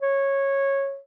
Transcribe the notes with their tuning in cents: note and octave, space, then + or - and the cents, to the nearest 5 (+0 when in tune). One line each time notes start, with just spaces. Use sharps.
C#5 -15